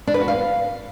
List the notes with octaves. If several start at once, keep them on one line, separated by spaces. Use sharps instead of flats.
D4
B4
F#4
F5